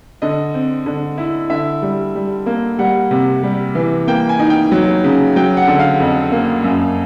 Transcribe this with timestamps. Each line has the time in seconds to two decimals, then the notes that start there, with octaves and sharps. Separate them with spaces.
0.22 D3 D#5
0.54 C4
0.86 D3
1.18 E4
1.50 D3 E5
1.82 G3
2.15 G3
2.46 A#3
2.79 G3 F#5
3.11 C3
3.43 G3
3.75 E3
4.07 A#3 G5
4.29 G#5
4.39 D#4
4.50 G5
4.72 F#3
5.04 C#3
5.36 F#3 G5
5.57 F#5
5.68 D3
5.79 F5
6.00 F2
6.32 A#3
6.64 F#2